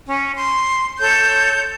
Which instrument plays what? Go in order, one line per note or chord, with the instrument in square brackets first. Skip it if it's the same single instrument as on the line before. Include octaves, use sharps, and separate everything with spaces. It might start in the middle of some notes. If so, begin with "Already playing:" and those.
[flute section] C#4
C6
A4 C#5 G6